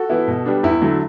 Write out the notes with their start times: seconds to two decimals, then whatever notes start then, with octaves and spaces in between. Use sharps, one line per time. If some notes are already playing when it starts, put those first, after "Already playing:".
Already playing: F#4 A4
0.09 E3 B3 E4
0.28 B2
0.46 G3 B3 D4
0.63 E2 E4
0.82 D3 F#3 A3